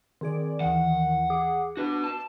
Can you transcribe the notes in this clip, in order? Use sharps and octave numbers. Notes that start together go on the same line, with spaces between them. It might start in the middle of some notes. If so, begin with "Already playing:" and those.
D#3 C4 G#4 D5
D#2 E3 F#5
G#4 D6
D4 F#4 B4
A5